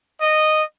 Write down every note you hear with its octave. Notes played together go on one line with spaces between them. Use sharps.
D#5